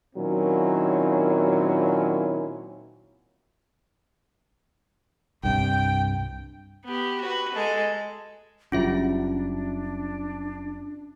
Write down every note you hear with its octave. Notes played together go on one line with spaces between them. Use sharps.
A#2 D#3 F#3 C4 C#4 E4
C2 G2 C3 G5
B3 G4
F#4 B4
G#3 A4
F#1 F#3 G3 C#4 D4 F4 E5